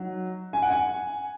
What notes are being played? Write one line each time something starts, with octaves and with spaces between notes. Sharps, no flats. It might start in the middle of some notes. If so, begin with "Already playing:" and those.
Already playing: F#3 D#4
G#5
F#5
G#5